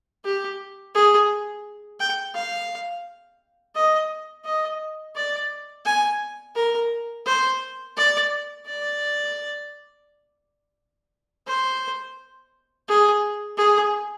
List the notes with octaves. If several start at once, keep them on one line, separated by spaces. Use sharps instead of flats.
G4
G#4
G5
F5
D#5
D#5
D5
G#5
A#4
C5
D5
D5
C5
G#4
G#4